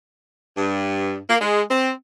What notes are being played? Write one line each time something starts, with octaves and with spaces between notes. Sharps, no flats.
G2
A#3
G#3
C4